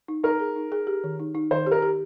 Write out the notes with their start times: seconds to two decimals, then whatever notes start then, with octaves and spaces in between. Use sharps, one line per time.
0.08 D#4
0.24 D#4 A#4
0.40 G#4
0.56 D#4
0.72 G#4
0.87 G4
1.04 D#3
1.20 D#4
1.35 D#4
1.51 D#3 C5
1.66 G4
1.71 A#4
1.82 G4